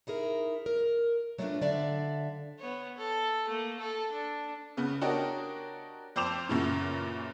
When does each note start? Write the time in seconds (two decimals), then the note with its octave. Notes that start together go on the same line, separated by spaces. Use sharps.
0.07 D#4 E4 G#4 A#4
0.66 A#4
1.38 F#3 A3 B3 C4 D4 F4
1.61 D3 F#3 D5 E5 F5
2.59 B3 C#5
2.97 A4
3.48 A3 A#3
3.80 A4
4.11 D4
4.77 C#3 B3
5.01 D4 F#4 G4 A#4 C#5 D#5
6.16 F2 C5 G5 D6 E7 F7
6.49 F#2 A#2 C#3 E3